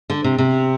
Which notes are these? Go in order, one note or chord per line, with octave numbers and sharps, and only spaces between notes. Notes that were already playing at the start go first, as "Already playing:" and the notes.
D3
C3
C3